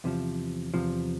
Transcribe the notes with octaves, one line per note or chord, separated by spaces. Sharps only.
E2 C3 F3
E2 C3 F3